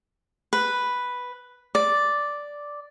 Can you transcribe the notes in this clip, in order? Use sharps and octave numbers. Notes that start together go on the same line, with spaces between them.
B4
D5